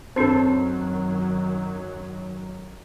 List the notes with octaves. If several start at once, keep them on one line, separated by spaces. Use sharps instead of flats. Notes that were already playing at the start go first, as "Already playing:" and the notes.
F#2 D#3 F#3 C4 D4 A4 C5